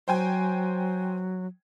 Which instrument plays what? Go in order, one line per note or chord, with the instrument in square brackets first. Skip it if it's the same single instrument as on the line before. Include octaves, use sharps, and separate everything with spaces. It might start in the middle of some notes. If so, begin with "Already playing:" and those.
[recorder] F#3 [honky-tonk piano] C5 G5 G#5